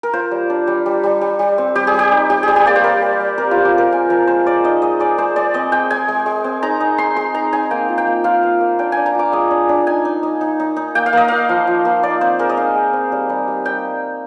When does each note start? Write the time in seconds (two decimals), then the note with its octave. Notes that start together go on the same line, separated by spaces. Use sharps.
0.03 A#4
0.13 F4 C5
0.31 G3
0.50 D4
0.67 G3
0.86 G3
1.03 G3
1.21 G3
1.39 G3
1.58 C4
1.75 G3 G4
1.87 G#4
1.94 G3 G4
2.12 D#4
2.30 G3 G4
2.43 G3 G#4
2.56 G4
2.66 A#3 D5
2.76 C5
2.84 G3 A#4
3.02 G3
3.20 G3
3.38 C4 A#4
3.51 F3 F4
3.65 G4
3.74 G#3 A#4
3.92 C4 G#5
4.10 F3 A#4
4.27 G#3 C5
4.46 G#3 D5
4.64 D#4 D#5
4.82 G#3 D#5
5.00 G#3 D5
5.18 G#3 C5
5.36 G#3 D5
5.54 C4 D#5
5.72 G#3 G5
5.91 G#3 G#5
6.08 G#3
6.26 G#3
6.44 C4
6.63 D#4 A#5
6.80 D#4
6.98 D#4 C6
7.16 G#3 C6
7.34 D#4 A#5
7.53 D#4 G#5
7.71 A#3 G5
7.89 F4
7.98 G5
8.07 A#3
8.24 F4 F5
8.43 A#3
8.61 A#3
8.79 D4 G5
8.92 D4 G#5
9.06 A#5
9.15 F4 D6
9.32 G#3 D#6
9.51 D4
9.69 D4
9.87 D#4 G#5
10.05 D#4
10.23 D#4
10.41 D#4
10.60 D#4
10.76 D#4
10.95 A#3 G5
11.06 F5
11.13 A#3 D#5
11.28 A#3 F5
11.49 F3
11.67 F3
11.85 A#3
12.03 D#4 D5
12.21 C4 C5
12.39 G#3 A#4
12.49 D#5
12.57 D#4 F5
12.75 G#3
12.93 C4
13.12 G3
13.29 G3
13.48 G3
13.65 G3 G5